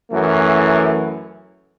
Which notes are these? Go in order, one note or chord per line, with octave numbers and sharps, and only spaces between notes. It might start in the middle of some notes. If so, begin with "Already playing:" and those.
F#2 E3 A3